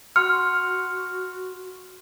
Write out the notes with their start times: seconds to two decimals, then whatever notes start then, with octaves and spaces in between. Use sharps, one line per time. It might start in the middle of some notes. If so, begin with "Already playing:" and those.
0.16 F#4 F#5 C6 F6 C#7